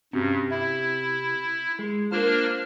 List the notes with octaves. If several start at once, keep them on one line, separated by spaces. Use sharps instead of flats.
G2 C3 C4 C#4 F#4
E4 E5
G#3
A#3 D4 F4 A#4 C5 F6